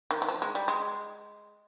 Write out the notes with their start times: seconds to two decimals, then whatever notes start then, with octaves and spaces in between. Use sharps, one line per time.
0.11 D#3
0.22 D#3
0.29 F3
0.42 G#3
0.55 G3
0.68 G#3